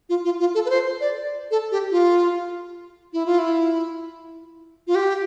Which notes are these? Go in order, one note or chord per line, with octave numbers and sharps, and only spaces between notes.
F4
F4
F4
A4
B4
C5
D5
A4
G4
F4
E4
F4
E4
F4
G4